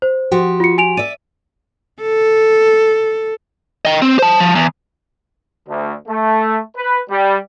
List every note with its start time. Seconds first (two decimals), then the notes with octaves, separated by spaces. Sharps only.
0.02 C5
0.31 F3 F#4 G4
0.60 F4 C#7
0.78 G#5 D7 F7
0.97 D5 E5 D#7
2.02 A4
3.85 D#5 G5
4.02 C4
4.19 C5 A5
4.40 F3
4.55 E2
5.68 D2
6.07 A3
6.76 B4
7.10 G3